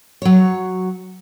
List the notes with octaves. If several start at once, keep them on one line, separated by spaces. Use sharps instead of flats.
F#3 C#5